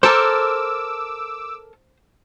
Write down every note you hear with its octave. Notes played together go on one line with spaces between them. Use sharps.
A4 A#4 C5 A5 D6 E6